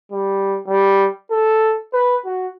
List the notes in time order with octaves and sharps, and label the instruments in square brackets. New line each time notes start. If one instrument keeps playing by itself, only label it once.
[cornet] G3
G3
A4
B4
F#4